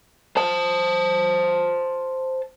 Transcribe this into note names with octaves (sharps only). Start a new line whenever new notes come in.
C5 A5